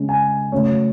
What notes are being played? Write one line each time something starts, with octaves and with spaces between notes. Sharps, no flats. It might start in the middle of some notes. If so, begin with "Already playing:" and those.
Already playing: C#3 G#3 C#4
G#5
C#3 F#3 A3 C#4 C#5